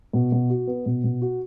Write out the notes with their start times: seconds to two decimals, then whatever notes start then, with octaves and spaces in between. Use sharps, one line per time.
0.13 B2
0.32 B2
0.50 F#4
0.67 B3
0.86 B2
1.04 B2
1.22 F#4